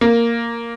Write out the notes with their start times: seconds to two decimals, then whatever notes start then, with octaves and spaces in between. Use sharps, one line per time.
0.01 A#3